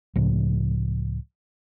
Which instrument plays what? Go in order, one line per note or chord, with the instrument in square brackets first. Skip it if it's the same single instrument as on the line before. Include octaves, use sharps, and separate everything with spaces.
[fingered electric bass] C#2 A2 C#3 F3